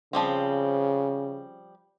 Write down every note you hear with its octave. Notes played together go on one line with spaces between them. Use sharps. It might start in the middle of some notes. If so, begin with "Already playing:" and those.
C#3 F3 G3 C4